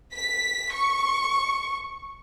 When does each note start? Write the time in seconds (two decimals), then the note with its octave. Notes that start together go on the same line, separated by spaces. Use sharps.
0.14 B6
0.74 C#6